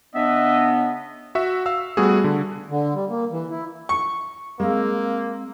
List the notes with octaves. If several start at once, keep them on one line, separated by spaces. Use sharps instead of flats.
C#3 B3 D4 D#5 E5
F#4 E5
F5 E6
G3 A3 B3 F#4 G#4
D3
D3
G3
A#3
E3
E4
C#6
G#3 A#3 C4 F5 E6